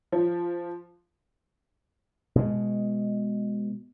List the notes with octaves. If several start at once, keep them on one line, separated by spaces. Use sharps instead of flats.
F3
B2 G#3